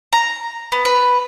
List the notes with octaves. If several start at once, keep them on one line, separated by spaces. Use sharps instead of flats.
A#5
B3
B4